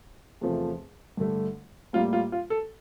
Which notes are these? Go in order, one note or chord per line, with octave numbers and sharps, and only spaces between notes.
E2 C3 F3 A3
G2 D3 A3
A2 G3 A#3 F4
F4
F4
A4